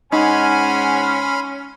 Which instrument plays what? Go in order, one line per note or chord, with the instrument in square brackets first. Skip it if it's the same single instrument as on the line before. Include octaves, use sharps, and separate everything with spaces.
[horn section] G#2 F#5 G#5 [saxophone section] C#4 [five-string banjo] D#4 [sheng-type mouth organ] B5 C6 F6